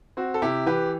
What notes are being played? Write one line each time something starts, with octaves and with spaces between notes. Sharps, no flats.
C4 F#4
A4
C3 E4 G4
E3 G4 B4